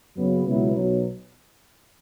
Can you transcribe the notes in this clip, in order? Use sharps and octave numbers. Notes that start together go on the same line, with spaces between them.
F#1 F#2 C#3 F#3 B3
C#2 B2 F#3 B3 E4
B1 B2 F#3